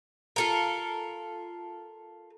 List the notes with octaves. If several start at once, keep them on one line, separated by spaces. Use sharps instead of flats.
F4 A4 A#4